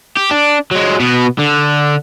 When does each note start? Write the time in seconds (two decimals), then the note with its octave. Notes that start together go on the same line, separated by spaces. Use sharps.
0.17 G4
0.31 D4
0.71 F#3 G#3
1.00 B2 B3
1.39 D3